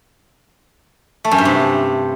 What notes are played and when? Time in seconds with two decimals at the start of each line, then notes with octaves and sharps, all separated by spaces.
1.25 A3
1.31 F#2
1.38 G2
1.45 C3